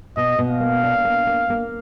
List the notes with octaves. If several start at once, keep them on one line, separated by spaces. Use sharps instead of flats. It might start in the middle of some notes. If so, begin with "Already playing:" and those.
B2 D#5
B2
F5
A#3
D4
A#3
A#3
A#3